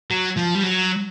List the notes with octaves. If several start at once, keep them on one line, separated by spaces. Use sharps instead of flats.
F#3
F3
G3
F#3